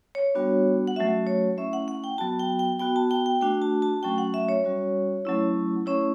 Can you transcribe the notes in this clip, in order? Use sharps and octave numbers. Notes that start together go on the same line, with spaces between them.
C#5
G3 B3 D4 F#4
F#5
F#3 A3 C#4 F#4 E5
C#5
A3 C#4 E4 E5
F#5
F#5
G5
F#3 B3 F#4 A5
G5
G5
B3 F#4 G5
A5
G5
G5
A3 D4 F#4 G5
A5
A5
F#3 A3 C#4 F#4 G5
F#5
E5
C#5
G3 C#4 F#4
F#3 A3 C#4 E4
A3 C#4 E4 C#5